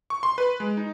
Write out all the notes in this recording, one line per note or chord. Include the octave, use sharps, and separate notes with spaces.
C#6
C6
B4
G#3
D#4